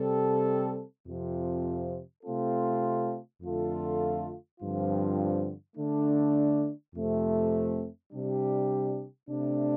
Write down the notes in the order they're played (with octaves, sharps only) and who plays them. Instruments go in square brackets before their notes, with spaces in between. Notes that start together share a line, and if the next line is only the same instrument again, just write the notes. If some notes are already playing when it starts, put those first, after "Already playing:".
Already playing: [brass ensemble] C3 G3 C4 A4
F2 C3 F3
C3 A3 C4 F4 A4
F2 D3 A3 F4 A4
G2 D3 F3 C4 F4
D3 A3 D4
F2 C3 A3 C4
C3 G3 D4 G4
C3 A3 D4